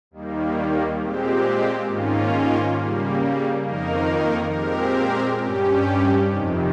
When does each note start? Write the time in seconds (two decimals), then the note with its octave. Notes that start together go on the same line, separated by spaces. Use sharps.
0.11 D#2 D#3 G3 A#3
0.99 A#2 G#3 C4 G4
1.86 G#2 D#3 A#3 C#4 F4
2.74 C#3 G3 A#3
3.62 F2 D#3 A#3 D#4 A#4
4.51 A#2 G#3 C4 G4 A#4
5.39 G2 G3 C#4 G4
6.27 F2 C3 D#3